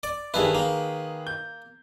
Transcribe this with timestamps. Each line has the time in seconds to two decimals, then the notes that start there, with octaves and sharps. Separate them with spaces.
0.03 D5
0.34 G2 D#3 E4 G#4 B4
0.55 A#3
1.27 G6